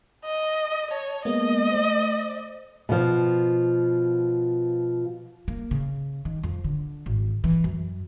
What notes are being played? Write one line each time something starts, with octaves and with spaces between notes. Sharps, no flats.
D#5
C#5 A5
G#3 A#3 B3 D#5
A3 C5
B2 F3
A#3
C#3
D#3
F2
D3
G#1
E3
F#2